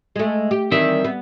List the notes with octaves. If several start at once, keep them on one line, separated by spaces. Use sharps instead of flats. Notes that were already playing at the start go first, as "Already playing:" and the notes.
G#3 A3
G4
D#3 E3 G3 C4 E5
B3